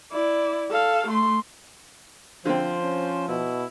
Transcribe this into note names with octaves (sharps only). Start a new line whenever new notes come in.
E4 D5
A4 F5
A3 C6
D3 F3 C4 C5
C#4
B2 E4